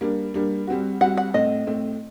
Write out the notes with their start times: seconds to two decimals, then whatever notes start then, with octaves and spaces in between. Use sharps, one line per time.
0.01 G3 A#3 D4
0.34 G3 A#3 D4
0.67 G3 C4 F#4
1.01 G3 C4 F#4 F#5
1.17 F#5
1.34 A2 A3 C4 D#5
1.67 A2 A3 C4